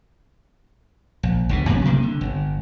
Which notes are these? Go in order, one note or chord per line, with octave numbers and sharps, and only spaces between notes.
A#1
G1 D2 B2
G2 A#2 F#3 C#4
C3 G3 A3 A#3
D3
G1